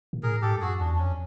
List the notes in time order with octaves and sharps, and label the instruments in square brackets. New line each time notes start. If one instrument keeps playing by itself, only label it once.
[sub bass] A#2
[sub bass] A2 [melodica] G#4 A#4
[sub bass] G#2 [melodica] G4 A4
[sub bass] G2
[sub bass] F#2 [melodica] F#4 G#4
[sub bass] E2 [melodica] D4
[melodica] D4
[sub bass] F2 [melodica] C#4